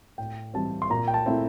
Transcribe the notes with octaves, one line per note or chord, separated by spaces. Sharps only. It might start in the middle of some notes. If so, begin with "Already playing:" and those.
A2 G5
E3 G3 C4 A5
C6
A#2 A#5
G5
A5
A3 C4 E4